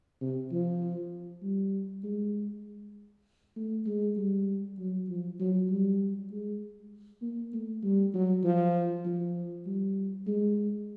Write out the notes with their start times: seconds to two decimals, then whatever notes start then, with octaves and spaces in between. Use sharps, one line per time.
0.21 C3
0.52 F3
1.43 G3
2.04 G#3
3.56 A3
3.86 G#3
4.17 G3
4.79 F#3
5.09 F3
5.39 F#3
5.70 G3
6.31 G#3
7.22 A#3
7.53 A3
7.83 G3
8.14 F#3
8.44 F3
9.05 F3
9.66 G3
10.27 G#3